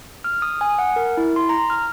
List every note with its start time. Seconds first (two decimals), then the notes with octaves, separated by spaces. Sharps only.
0.24 F6
0.42 D#6
0.61 G#5
0.79 F#5
0.96 A#4
1.17 E4
1.36 C6
1.49 A#5
1.70 F6